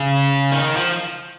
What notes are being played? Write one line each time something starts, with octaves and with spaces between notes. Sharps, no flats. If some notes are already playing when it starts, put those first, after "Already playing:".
Already playing: C#3
D#3
F3